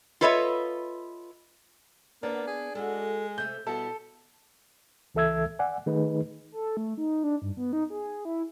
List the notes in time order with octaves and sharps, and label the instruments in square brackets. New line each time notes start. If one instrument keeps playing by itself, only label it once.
[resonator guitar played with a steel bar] F4 A4 B4 C#5 D#5 E5
[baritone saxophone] A#3 [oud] B3 [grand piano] D4
[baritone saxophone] G#4
[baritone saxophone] G#3 [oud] F#4 A4
[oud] C3 A3 [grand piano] G6
[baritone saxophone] B2 [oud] G3 E4 [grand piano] A4
[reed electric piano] C#2 E3 A4 E5 E6 G#6
D5 F#5 G#5
D#3 A3 D#4 G#4 B4
[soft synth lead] A4
A3
D#4
D4
G2
B3
D#4
G#4
E4